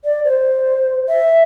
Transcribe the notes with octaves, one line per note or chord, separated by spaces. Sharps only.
D5
C5
E5